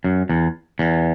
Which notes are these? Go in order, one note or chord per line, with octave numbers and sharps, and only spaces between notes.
F#2
E2
E2